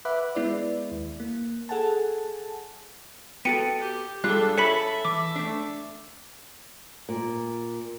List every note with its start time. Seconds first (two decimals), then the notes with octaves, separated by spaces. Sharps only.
0.05 B4 E5 F#5 B5 D6 F#6
0.35 G#3 B3 E4 B4 D5
0.92 D#2
1.20 A#3
1.69 G#4 A4 F#5 G#5 A5
3.45 B3 F#4 A4 G5 C#7 D#7
3.80 G4
4.24 G3 G#3 D4 F4 A4 F#6
4.57 A4 C#5 E5 G#5 A5 B5 B6 C#7
5.05 E3 D6
5.36 A3 D4
7.09 A#2